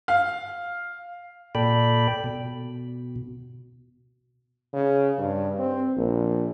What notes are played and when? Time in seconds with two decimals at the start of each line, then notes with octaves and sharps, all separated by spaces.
0.08 F5
1.55 A#2 A4 D5 G5 B5
2.24 B2
4.73 C#3
5.18 G2
5.59 C4
5.96 A#1